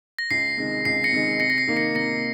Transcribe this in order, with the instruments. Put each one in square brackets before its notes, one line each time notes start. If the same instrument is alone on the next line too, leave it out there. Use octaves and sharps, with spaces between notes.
[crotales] A#6
[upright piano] C#2 [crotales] C7
[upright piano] C3 D#3 G#3
[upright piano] C#2 [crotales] C7
[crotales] A#6 C#7
[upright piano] C3 D#3 G#3
[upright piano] C3 [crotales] A#6 C#7
[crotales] A#6
C7
[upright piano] D#3 A#3 D#4
[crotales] A#6 C#7
[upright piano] C3 [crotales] A#6 C#7